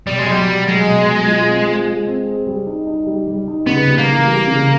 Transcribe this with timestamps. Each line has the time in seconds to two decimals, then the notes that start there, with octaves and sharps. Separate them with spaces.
0.07 B2 G3
0.18 G#3
0.26 F#3 G3
0.47 F#3
0.67 F#3 G#3
0.87 B2
1.06 F#3
1.26 F4
1.46 C4
1.67 F4
1.87 G#3
2.07 C4
2.27 G#4
2.47 G3
2.67 D#4
2.87 D#4
3.07 G3
3.27 G3
3.48 D#4
3.67 C#3 B3
3.88 G3
3.98 A#3
4.07 E3
4.27 G3
4.47 C#3